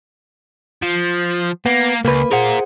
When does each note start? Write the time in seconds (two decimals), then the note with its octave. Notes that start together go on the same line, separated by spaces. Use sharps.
0.82 F3
1.66 A#3 B3
2.05 C#2 A#3 B4
2.32 F4 G#4 A#4 C5 F#5